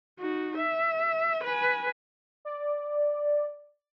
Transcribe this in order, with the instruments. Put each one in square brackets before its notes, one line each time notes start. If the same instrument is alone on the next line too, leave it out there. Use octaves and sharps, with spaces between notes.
[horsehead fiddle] D#4 F#4
E5
B4 G#5
[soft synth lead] D5